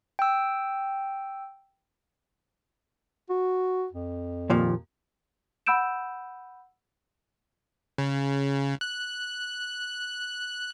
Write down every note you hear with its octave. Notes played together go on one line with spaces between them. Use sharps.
G5 E6
F#4
F2
D#2 A#2 F3
F#5 B5 E6 G6 D7 E7
C#3
F#6